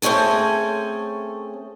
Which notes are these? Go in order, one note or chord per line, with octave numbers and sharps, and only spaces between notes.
A3 C4 C#4 G#4 A4